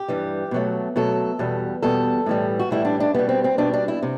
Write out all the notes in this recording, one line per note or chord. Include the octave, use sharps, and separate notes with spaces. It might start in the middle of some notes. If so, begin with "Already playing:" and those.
Already playing: G4
G2 E3 G3
B2 F#3 A3
B2 F#3 A3 A4
E2 B2 G3
E2 B2 G3 A4
A2 E3 G3
F#4
A2 E3 G3 E4
D4
D4
B2 G3 B3
C4
C4
B2 G3 D4
D4
E4
C3